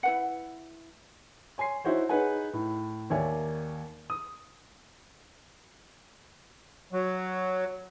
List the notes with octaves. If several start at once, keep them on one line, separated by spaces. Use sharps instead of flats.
E4 B4 F#5
C#5 G#5 C6 C7
D#4 E4 F#4 C5 C#5
D#4 G#4 B4 C#5 F#5 G#5
A2
D#2 A#3 C#5 D5 E5 G#5
D#6
F#3